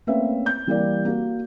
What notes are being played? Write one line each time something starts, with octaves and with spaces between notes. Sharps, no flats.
A3 A#3 C4 C#4 B4 E5
G6
E3 G3 A#3 G4 A#4 D5
A#3 F#4